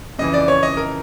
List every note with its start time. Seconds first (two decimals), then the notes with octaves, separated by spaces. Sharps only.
0.18 F2 C#3 E3 D#5
0.34 D5
0.48 C#5
0.63 D#5
0.77 A#4